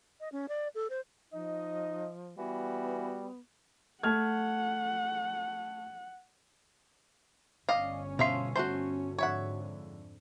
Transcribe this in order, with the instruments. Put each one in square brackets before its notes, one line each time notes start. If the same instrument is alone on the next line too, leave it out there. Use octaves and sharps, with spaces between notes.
[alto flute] D#5
C#4
D5
A4
C5
[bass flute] F3 [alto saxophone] D#4 [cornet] D#5
[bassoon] E3 [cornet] G3 [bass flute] B3 [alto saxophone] F#4
[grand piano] A3 F6 G#6 [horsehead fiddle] F#5
[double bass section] G1 C#4 [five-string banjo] D5 D#5 F5
[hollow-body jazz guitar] B2 C6 [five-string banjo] F3 E5 F5
[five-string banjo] A3 C5 [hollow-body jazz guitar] F#4 C6
[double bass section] F2 G#2 D3 [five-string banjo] C#5 E5 F#5